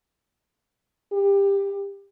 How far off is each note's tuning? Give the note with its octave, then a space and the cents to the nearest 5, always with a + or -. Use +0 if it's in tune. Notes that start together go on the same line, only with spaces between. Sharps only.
G4 +20